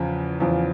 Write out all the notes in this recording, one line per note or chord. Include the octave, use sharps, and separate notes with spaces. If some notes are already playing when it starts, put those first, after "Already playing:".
Already playing: E2 C#3 F3
E2 C#3 F3